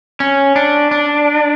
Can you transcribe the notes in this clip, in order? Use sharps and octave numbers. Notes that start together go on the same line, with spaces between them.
C#4
D4
D4